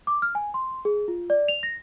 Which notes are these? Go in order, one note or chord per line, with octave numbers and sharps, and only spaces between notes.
D6
F6
G#5
C6
G#4
F4
D5
F7
A#6